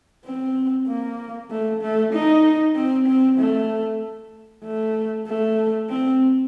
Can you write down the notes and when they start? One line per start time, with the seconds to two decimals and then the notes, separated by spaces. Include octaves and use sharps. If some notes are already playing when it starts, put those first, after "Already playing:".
0.25 C4
0.87 A#3
1.50 A3
1.82 A3
2.13 D#4
2.76 C4
3.07 C4
3.39 A3
4.64 A3
5.27 A3
5.89 C4